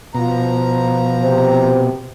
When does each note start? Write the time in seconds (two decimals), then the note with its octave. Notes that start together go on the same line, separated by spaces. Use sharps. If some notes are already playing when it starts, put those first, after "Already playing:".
0.15 B2 F3 A#5
1.23 C3 C5